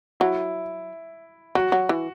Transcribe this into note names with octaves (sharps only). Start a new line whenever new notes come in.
F#3 E4
F#3 F#4
F#3
E3